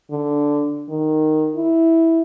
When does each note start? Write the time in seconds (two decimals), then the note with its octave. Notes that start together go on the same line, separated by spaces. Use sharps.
0.11 D3
0.89 D#3
1.56 E4